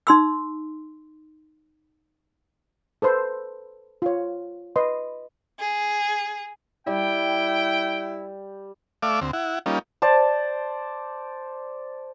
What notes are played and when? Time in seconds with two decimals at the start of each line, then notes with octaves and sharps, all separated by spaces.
0.07 D#4 C6 E6
3.02 A4 B4 C5 C6
4.02 F4 C#5
4.76 B4 D#5 C6
5.59 G#4
6.87 G3 E4 G5
9.02 A3 D5 E5 F5 D6
9.21 D2 C4
9.33 E4 F#5
9.66 G3 A#3 C#4 D#4 F4
10.02 C5 D5 A5